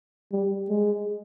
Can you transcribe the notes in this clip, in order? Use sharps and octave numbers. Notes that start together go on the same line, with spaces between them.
G3
G#3